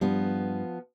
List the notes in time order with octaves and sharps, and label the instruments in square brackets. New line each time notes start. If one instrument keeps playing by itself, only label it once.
[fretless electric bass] G2 G3 [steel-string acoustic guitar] F3 B3